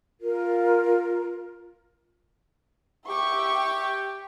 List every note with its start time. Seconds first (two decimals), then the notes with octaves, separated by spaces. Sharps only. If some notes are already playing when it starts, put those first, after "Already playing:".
0.21 F4 A#4
3.08 G4 E5 C#6